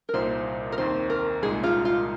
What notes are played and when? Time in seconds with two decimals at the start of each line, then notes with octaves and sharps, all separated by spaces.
0.09 A#4
0.14 C2 A#2 A#3 D#4 C5
0.72 A#4
0.78 D#2 D#3 C4 C5
1.10 A#4
1.42 C2 A#2 G#3 D#4 G#4
1.64 F4
1.85 F4